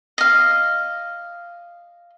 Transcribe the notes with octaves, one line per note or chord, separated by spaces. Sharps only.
D#5 F5